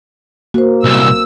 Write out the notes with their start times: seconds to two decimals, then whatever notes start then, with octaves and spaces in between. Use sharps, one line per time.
0.54 A#3 F#4 C5
0.84 C2 A#2 E6